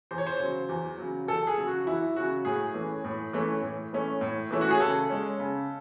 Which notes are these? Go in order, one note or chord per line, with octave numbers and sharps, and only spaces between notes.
E2 C5
C#5
C5
C#3 F#3
E2
C#3 F#3
E2 A4
G#4
C#3 F#3
F#4
E2 E4
C#3 F#3 F#4
A2 G#4
E3 A3 C#4
A2
E3 A3 C#4
A2
E3 A3 C#4
A2
E3 A3 C#4 E4
F#4
G#4
C#3 A4
G#3 C#4
C#3